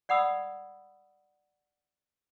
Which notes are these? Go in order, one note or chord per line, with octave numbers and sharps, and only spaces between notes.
D5 F#5 B5 D#6 E6